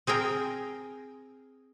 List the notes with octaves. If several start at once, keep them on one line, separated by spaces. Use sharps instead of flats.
C4 G#4 A#4 G5